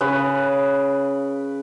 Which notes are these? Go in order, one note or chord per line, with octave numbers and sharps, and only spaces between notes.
C#3 B4